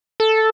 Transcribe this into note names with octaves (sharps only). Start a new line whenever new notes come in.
A4